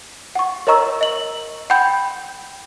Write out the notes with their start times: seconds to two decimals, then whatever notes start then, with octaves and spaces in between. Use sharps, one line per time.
0.35 F#5 C#6
0.67 A#4 C#5 D#5 A#5 C#6 E6
1.01 D#5 F#7
1.70 F#5 G5 B5 G6